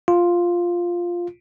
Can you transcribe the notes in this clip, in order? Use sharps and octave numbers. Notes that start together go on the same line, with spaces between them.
F4